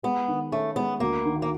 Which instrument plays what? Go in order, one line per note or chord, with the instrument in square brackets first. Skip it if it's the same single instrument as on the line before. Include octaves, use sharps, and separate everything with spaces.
[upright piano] G#3 [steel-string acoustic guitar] B3
[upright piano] D#3
[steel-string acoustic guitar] A3 [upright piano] C#4
[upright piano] G#3 [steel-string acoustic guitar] B3
[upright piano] D2 [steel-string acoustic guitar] A#3
[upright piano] D#3
[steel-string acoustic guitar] A#3